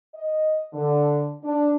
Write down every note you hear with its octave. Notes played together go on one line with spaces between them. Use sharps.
D#5
D3
D4